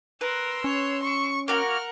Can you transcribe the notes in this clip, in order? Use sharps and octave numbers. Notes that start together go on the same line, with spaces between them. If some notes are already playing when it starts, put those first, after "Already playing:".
A#4 B4 C6 E6
C#4 C#5
C#6
A#3 F#4 A#4 F#5 F6